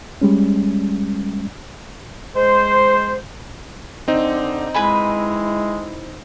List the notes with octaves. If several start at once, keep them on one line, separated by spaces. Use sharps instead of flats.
G3 G#3 C#4
G#3 C5
D3 C4 D#4
G#3 E4 B4 G#5 B5